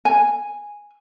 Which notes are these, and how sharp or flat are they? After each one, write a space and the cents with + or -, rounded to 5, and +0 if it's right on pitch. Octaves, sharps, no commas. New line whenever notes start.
G#5 -5